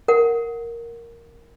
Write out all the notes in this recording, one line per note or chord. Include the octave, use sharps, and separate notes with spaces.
A#4 F#5